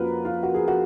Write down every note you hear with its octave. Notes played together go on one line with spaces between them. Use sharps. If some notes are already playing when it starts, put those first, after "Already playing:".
Already playing: F2 F3 A#3 C#4 F4 F#4 A#4 B4
F4
F#4
G#4
F#4